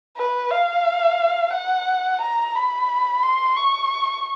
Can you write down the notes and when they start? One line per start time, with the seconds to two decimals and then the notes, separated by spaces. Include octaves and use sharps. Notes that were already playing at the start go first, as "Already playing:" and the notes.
0.17 B4
0.51 F5
1.53 F#5
2.21 A#5
2.55 B5
3.23 C6
3.56 C#6